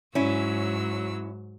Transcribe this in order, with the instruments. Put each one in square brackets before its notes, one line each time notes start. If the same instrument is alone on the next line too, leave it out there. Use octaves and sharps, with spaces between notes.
[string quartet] G#2 F#3 E6 [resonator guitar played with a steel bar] C#4 E4